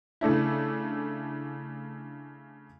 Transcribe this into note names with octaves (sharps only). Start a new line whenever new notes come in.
C#3 A3 D4 E4